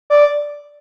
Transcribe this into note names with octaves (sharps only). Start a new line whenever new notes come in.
D5